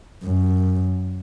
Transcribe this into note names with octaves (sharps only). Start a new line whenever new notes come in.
F#2